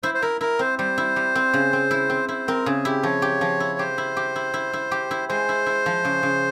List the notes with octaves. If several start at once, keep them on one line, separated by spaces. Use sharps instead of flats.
E4 C5
C5
E4 A#4
E4 A#4
C4 C5
G3 C5
E4
G3
C4
C#3
C4
E4
C4
E4 C5
C4 A#4
C#3 G#4
E4 G4
F3 C#5
G4
F3
E4
G4 C5
E4
G4
E4
E4
E4
G4
E4
G#3 C5
E4
E4
F3
C#3
C#3